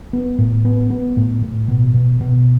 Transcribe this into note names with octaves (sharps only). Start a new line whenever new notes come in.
B3
A2
B3
B3
A2
A2
B2
B2
B2